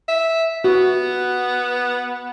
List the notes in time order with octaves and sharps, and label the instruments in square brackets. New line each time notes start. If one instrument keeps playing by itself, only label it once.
[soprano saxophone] E5
[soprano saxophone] B3 [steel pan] F#4